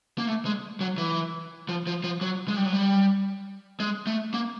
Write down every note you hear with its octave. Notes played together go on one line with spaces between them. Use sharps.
A#3
A3
G#3
F#3
E3
F3
F3
F3
F#3
G#3
G3
F#3
G3
G#3
A3
A#3